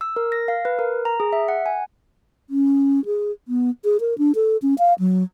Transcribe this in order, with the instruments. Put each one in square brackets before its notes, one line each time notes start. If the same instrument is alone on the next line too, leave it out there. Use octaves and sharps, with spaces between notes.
[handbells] E6
A#4
A#6
F5
B4
A#4
A#5
G#4
E5
F#5
G#5
[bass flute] C#4
G#4
B3
G#4
A#4
D4
A4
C#4
F5
F#3